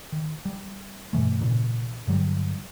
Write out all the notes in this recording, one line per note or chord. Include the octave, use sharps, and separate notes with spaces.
D#3
G3
G2 B2 E3 A3
G#1 A#2 C#3 E3
G2 D3 F#3 G3